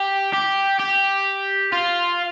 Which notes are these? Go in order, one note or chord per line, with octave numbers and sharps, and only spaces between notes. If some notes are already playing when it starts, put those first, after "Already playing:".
Already playing: G4
G4
G4
F4